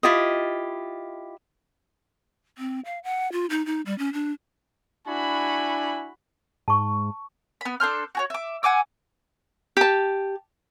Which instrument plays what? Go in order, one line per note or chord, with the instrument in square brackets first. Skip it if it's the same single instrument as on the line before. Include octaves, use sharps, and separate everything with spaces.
[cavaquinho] E4 F4 G4 D#5
[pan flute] C4
F5
F#5
F4
D#4
D#4
G3
C#4
D4
[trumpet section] D4 E4 G#5 [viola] F#4 B5
[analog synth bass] G#2 [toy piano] A5 C#6
[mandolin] B3 B5
D4 A4 C5 F6
F#4 G#4 C#5
E5 D6
F#5 G#5 D6 E6
[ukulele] G4 A5